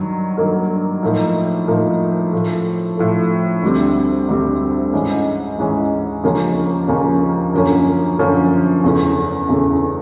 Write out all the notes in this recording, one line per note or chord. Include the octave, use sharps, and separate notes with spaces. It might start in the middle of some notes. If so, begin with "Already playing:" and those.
Already playing: G2 D#3 F#3
G2 D#3 F#3 A#3
A2 F3 A#3 D#4
A2 F3 A#3 D#4
A2 F3 A3
A2 F3 A3
D2 D3 G3 C4
D2 D3 G3 C4
G#2 E3 G#3 C#4
G#2 E3 G#3 C#4
D#2 C#3 F3 A#3 C#4
D#2 C#3 F3 A#3 C#4
F#2 D3 F3 A#3 C#4
F#2 D3 F3 A#3 C#4
E2 C#3 E3 A3
E2 C#3 E3 A3